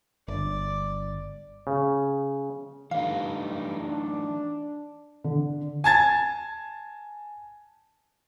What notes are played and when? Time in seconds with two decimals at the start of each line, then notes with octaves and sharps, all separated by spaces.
0.28 G1 D5
1.67 C#3
2.91 G2 E3 A3 D#4 F5
3.80 D4
5.24 D3
5.84 G#5 A5 G#6 A6